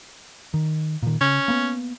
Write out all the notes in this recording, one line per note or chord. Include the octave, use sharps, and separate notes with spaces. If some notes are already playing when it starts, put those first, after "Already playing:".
D#3
A#2 D#3
C#3 C#4
A#3 B3